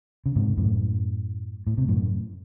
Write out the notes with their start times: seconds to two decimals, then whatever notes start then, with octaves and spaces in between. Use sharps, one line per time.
0.26 C#3
0.36 G#2 C3
0.57 F#2 A2
1.67 A2
1.78 C3
1.88 F#2 A2